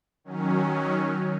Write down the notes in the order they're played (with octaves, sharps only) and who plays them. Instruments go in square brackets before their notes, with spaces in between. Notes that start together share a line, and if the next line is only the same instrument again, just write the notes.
[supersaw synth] D#3 F#3 C#4